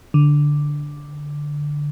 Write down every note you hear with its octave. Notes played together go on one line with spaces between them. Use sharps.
D3